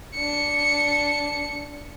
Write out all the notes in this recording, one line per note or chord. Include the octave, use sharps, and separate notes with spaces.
D4 C#7